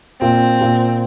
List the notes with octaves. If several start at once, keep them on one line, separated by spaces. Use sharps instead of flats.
A#2 C4
A#2